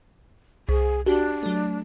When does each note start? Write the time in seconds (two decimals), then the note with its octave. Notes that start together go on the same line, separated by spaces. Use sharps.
0.69 C2 G#4
1.06 D4 F#4 G4
1.43 F#3 A3